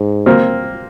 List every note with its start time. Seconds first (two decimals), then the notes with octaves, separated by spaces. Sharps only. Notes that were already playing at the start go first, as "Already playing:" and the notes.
Already playing: G#2
0.26 A#3 C4